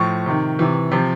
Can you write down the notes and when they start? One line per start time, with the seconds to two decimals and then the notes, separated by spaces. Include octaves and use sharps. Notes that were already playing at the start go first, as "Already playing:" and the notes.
Already playing: A2 F3 C#6
0.26 C3 D#3
0.59 C3 E3
0.92 C3 F3